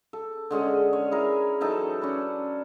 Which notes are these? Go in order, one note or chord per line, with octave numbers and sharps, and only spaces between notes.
A4
D3 G#3 C#4 G#4
C#5
E4 G#4 A#4
E3 F#3 D#4 A4
C#4 D4 B4